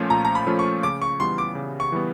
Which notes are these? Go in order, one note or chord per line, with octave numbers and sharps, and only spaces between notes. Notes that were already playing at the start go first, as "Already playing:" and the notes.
Already playing: A#2 F3 A3 C#4 F4
A#2 A#5
A#5
B5
F3 A3 C#4 F4
C#6
C#3 D6
C#6
E3 G3 B3 C6
D6
C#3
C#6
E3 G3 B3